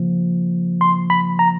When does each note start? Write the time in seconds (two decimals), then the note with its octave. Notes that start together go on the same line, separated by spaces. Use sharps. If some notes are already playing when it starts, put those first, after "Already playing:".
Already playing: C#3 F3 A#3
0.81 C6
1.10 B5
1.39 A#5